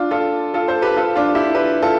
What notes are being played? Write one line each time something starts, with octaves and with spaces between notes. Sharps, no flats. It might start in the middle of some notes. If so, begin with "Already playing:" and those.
Already playing: D4 F4
F4 A4
F4 A4
A4 C5
G4 B4
F4 A4
D4 F4
E4 G4
G4 B4
F4 A4